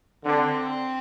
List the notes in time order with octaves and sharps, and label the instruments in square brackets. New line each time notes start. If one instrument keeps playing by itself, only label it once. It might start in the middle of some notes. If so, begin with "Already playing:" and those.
[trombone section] D3 [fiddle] C4